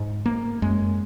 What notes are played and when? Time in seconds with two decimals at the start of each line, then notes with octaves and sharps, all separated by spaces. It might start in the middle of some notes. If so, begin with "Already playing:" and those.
Already playing: G#2
0.26 A#3
0.62 F#2 G#3